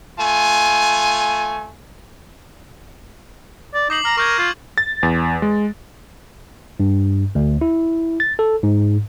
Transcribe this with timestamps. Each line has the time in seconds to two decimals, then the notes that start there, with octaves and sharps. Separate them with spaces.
0.19 A3 F4 G#5
3.74 D5
3.90 D#4 D6 C7 F#7
4.05 A#5 F6
4.18 A#4 C#6 G6 G#6
4.39 F4
4.78 A6
5.03 E2
5.42 G#3
6.80 G2
7.35 D2
7.61 E4
8.20 A6
8.39 A4
8.63 G#2